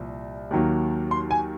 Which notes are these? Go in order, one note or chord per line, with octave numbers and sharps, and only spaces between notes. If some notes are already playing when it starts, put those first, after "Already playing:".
Already playing: C2 A#2 F3
D#2 D#3 F#3 A#3
C6
G#5